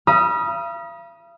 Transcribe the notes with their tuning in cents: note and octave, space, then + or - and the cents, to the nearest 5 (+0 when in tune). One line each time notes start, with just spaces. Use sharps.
F5 -40 B5 -40 D#6 +10